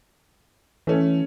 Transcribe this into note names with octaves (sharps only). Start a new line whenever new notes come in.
E3 A3 C#4